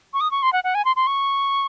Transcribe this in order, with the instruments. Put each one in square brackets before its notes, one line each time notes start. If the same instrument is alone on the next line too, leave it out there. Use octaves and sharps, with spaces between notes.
[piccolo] C#6
D#6
C#6
C6
F#5
F#5
G#5
C6
C6
C#6